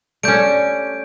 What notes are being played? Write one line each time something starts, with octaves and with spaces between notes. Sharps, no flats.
G3 A3 C#4 D4 D5 G6 D7